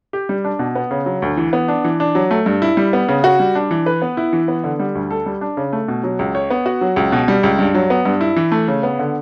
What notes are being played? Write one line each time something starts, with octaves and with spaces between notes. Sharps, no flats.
G4
G3
D4
B2
B3
C#3
F#3
D2
E3
B3
D4
E3
D4
F#3
A3
G2
E4
G3
B3
C#3
F#4
G3
D4
E3
B4
B3
E4
E3
B3
D3
G3
D2
A4
G3
D4
C#3
A3
B2
F#3
C#2
C#5
B3
F#4
F#3
C#2
B2
G3
C#2
G2
F#3
B3
G2
E4
E3
A3
C#3
B3
D3